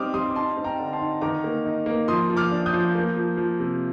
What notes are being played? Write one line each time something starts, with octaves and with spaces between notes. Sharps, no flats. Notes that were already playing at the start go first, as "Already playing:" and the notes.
Already playing: G3 C4 D#4 D6 D#6 F6
G3 C6 D#6
D6
D#4 A5 C6
C4
G5 A#5
D3
A5 C6
D#4
D#3 A#5 D6
A#3
D#4
A#3
F3 C6 D#6
F3
D6 F6
D4
D#6 G6
F3
A#3
F3
F3
C3